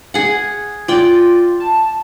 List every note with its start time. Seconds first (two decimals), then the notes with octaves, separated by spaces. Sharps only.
0.14 G#4 F#5
0.88 F4 D5 G5
1.60 A5